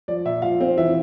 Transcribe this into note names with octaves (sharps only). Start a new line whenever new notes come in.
F3 D5
A#2 E5
F3 F5
C4
E3 E5